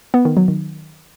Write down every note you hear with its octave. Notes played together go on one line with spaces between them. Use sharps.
B3
D#3
F#3
D#3